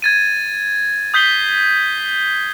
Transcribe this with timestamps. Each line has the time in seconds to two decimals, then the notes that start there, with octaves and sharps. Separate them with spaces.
0.02 G#6 A6 D#7
1.14 D#6 G6 B6 C7 G7